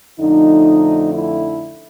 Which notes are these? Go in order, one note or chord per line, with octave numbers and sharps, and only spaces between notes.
F2 D3 F3 A3 D#4
E4